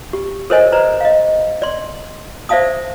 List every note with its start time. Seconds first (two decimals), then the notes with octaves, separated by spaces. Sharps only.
0.13 G4
0.50 A4 A#4 C5 C#5 D#5 G#5
0.72 B4 C5 D5 A#5
1.01 D#5 F5
1.62 D5 C6
2.49 C5 D5 E5 F5 A5 D#6